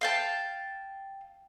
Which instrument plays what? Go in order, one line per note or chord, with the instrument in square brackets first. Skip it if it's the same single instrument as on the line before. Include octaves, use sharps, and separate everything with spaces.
[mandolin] F5 G5 A5